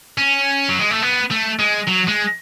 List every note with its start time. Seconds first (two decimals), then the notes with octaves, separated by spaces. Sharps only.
0.18 C#4
0.69 F#3
0.79 G#3
0.91 A3
1.03 B3
1.31 A3
1.59 G#3
1.87 F#3
2.07 G#3